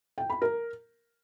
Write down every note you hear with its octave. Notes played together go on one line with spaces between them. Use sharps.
G5
B5
A#4